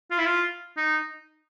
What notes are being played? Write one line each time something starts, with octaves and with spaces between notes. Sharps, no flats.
F4
E4
F4
D#4